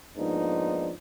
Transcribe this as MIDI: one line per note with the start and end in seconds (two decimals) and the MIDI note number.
0.17 0.91 44
0.17 0.91 53
0.17 0.91 58
0.17 0.91 59
0.17 0.91 62
0.17 0.91 63